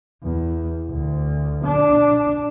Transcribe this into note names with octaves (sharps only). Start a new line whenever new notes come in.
E2
D2
D4